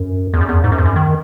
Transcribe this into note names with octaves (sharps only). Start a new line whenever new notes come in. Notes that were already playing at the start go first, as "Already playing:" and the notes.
Already playing: F#2
E2
F#2
E2
G#2
F#2
E2
F#2
D#3